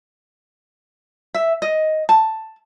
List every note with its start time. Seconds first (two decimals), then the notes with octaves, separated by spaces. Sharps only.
1.34 E5
1.62 D#5
2.09 A5